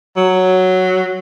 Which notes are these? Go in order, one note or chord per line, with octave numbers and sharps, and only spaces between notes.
F#3